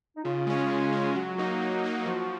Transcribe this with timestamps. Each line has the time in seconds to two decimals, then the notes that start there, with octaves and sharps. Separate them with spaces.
0.17 D#4
0.24 C#3 F4
0.47 G#3 C#4
0.70 C#3
0.93 G#3 C#4
1.15 F#3 F#4
1.38 A#3 D#4
1.61 F#3
1.84 A#3 D#4
2.06 F3 F#4